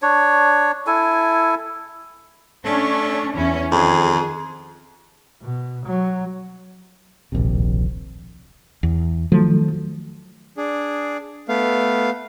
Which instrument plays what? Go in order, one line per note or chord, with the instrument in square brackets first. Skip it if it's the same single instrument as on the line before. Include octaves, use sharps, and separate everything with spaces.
[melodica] D4 C#5
E4 A4 G#5
[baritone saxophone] A3 [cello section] C#4 D4
[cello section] E2 C#4 E4
[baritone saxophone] F2 [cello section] D#3 G#4
[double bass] B2
F#3
[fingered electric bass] D1 A#1 D#2 C3
[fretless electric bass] E2
[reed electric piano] D#3 F#3 A3 [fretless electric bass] F3
[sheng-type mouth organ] D4 G#4
A3 B3 F5